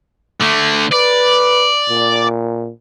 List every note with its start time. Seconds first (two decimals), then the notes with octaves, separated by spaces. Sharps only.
0.41 D3 A3
0.92 B4 D5
1.89 A#2